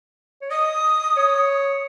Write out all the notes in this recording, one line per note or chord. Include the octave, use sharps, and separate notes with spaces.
C#5
D#5 D#6
C#5